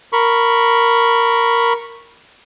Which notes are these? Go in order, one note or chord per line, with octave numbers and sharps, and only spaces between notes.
A#4 B5 C#6